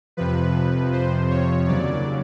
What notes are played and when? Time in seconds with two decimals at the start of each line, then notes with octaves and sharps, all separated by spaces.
0.17 F2 C3 F3 B4
0.92 C5
1.30 C#5
1.68 D#2 C#3 F#3 D5